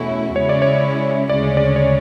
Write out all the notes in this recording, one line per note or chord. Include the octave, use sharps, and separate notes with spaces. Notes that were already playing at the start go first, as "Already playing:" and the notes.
Already playing: E2 B2 A3 C#4 E4 F#4
C#3 G#3 C#4 E4 C#5
D5
C#5
D2 C#3 G#3 C#4 D5
D5
C#5